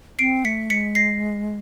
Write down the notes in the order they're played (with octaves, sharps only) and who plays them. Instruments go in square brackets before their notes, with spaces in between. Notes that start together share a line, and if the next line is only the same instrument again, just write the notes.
[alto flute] C4 [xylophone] C7 D7
[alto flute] A3 [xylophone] B6 C#7
[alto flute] G#3 [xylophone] B6 C#7
[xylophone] A#6 C7